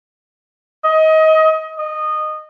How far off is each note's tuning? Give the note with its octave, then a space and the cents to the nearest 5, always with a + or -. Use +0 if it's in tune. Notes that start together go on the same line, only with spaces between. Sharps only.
D#5 +25
D#5 -15